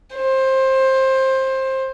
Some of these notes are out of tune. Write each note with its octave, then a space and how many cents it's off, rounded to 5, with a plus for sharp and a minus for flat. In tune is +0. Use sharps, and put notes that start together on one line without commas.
C5 +20